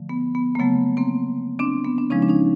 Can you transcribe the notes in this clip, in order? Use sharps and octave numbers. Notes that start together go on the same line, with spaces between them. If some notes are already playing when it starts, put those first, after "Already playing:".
Already playing: D3 F3 A3
B3
B3
A#3
C#3 F#3 A3 B3
A#3 C4
C4 D4
B3
D4
C#3 F3 G#3 C#4 D#4
D4
C#4 D#4